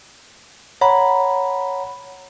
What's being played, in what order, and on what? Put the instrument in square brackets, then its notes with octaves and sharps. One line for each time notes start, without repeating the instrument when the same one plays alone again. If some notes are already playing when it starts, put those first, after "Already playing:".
[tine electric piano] C#5 F#5 A#5 B5